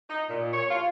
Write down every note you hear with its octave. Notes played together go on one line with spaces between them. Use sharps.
D#4
A#2
C#5
F4